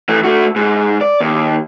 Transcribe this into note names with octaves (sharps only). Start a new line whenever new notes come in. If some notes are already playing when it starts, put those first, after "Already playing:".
E3 A3
A3 F#4
G#2
D5
D#2